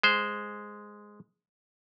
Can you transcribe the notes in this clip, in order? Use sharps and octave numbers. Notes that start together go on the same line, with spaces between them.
G#3 C5